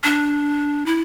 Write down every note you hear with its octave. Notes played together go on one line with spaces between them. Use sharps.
D4
E4